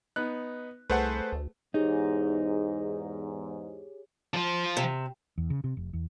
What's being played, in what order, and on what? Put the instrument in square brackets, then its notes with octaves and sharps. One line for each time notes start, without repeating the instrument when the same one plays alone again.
[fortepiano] B3 D#4 [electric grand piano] F#6
[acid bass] C2 [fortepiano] A3 G#4 [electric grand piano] B4 C5 F#5
[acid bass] D2
[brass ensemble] E2 G#2 [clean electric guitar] D#4 [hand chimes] G4 G#4 C#5
[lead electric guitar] F3 F4
[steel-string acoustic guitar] C3
[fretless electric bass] E2
C#3
C3
F1
E2